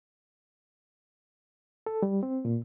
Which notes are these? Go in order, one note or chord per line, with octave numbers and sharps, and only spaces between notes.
A4
G3
C4
A#2